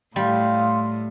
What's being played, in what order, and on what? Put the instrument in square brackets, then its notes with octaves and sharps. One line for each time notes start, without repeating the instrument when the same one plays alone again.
[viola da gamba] A2 [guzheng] G3 [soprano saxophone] F5 [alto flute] C6